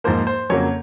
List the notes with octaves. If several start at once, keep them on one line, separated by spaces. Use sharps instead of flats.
G#2 F3 A#3 C5
C5
F2 C#3 F#3 A#3 C#5